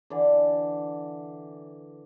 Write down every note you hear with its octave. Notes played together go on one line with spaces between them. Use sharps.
D3 E3 D5